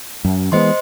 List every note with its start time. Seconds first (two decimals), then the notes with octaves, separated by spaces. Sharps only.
0.25 F#2
0.52 E3 G#3 B3 C5 D#5 C6